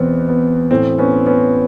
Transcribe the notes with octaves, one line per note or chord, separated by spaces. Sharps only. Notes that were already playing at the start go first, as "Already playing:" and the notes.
Already playing: E2 B2 B3 C4
B3
A2 E3 C4
B3 C#4
B3 C#4